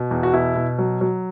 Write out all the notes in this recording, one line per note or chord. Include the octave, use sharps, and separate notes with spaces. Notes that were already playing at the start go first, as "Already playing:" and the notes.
Already playing: B2
E2
F#4
B2 E4
B2
F#3
F#3